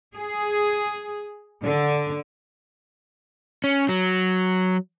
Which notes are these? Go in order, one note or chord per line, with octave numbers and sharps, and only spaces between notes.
G#4
D3
C#4
F#3